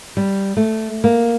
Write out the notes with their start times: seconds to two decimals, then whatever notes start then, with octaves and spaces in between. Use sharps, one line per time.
0.17 G3
0.57 A3
1.04 A#3